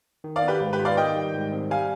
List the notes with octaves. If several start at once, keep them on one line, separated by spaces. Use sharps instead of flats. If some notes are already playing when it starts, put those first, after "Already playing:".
D#3
D5 F5
B3
G4 B4
G#2
G4 B4
F4
D5 F5
D#3 D#5 G5
G3
G#2
C4
G3 F5 G#5